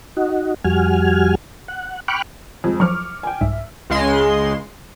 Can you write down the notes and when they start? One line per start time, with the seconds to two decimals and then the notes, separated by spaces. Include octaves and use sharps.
0.17 D#4 F#4
0.64 F2 G3 F#4 G#5 F6
1.68 F#5
2.08 G5 B5 C#6 D6 F6 F#6
2.64 F2 G#3
2.80 F3 F#3 C#6 D6 F6
3.23 G5 G#5
3.41 C2 G#2 E5
3.90 C#2 C#3 G#3 C6